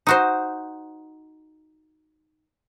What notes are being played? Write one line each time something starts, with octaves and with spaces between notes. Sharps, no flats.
D#4 F#4 C5